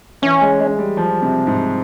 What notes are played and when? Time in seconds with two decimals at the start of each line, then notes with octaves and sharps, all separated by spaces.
0.22 E3 C#4
0.41 G#3
0.59 G#3
0.79 G3
0.97 F3
1.22 C3
1.47 G#2